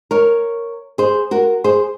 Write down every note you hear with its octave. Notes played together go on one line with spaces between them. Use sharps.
A#4 C#5
G#4 C5
F#4 A#4
G#4 C5